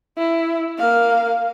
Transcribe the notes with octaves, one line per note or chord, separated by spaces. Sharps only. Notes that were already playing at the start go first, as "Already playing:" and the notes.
E4
A#3 F5